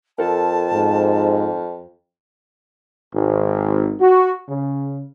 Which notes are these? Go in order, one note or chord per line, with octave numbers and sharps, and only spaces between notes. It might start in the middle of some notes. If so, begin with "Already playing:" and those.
F2 F4 A4 A#4 A5
G#2
G#1
F#4
C#3